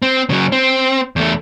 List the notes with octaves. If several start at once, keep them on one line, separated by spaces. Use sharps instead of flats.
C4
C#3 F#3
C4
E2 A3